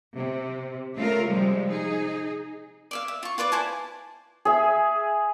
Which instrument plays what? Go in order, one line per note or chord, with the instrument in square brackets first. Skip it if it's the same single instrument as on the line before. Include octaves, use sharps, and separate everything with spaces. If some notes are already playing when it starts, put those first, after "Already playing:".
[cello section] C3
C#3 A3 F4 A#4
C3 F3 G3 G#3
D#4 G#4
[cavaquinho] D5 E5 F5
E5
F4 C#6
F4 B4 D5 D6
E4 C5 G#5 A5
[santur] G#4 E5